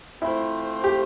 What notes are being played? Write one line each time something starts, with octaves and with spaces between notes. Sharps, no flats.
A3 C4 E4 F4 C5
G4